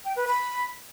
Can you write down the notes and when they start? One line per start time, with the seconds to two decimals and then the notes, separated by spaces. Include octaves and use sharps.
0.04 G5
0.15 B4
0.27 B5